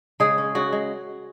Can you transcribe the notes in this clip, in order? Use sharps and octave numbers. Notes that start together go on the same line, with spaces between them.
C#3 G#3 G#4
C#4
C#3 F#4
G#3